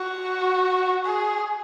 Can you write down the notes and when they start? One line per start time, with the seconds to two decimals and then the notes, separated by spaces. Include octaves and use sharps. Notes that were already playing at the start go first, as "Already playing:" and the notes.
Already playing: F#4
1.05 G#4